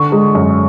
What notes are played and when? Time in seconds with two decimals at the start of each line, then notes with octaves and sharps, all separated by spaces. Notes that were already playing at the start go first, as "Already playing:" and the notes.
Already playing: D3 C#6
0.12 G#3
0.35 F#2